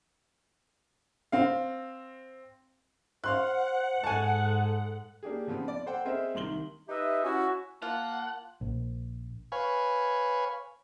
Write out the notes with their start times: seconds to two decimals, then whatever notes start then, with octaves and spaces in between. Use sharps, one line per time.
1.32 C4 F5
3.24 C5 F5 F#5 C6 F#6
4.04 G#2 A4 G#5 A5
5.23 A#3 D4 G4 G#4
5.47 C#3 F3 B3 C4
5.68 D5
5.86 A4 C5 F#5 G5
6.05 C4 G#4 A#4 C5 D#5 E5
6.34 C2 D#3 C6 F#7 G7
6.89 D#4 G4 B4 D#5 E5
7.23 C#4 E4 F#4
7.82 A#3 F4 F#5 A5
8.61 A#1
9.52 B4 C#5 F5 G#5